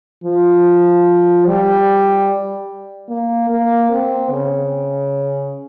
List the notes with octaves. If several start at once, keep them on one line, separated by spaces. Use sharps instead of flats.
F3
G3
A#3
A#3
C4
C#3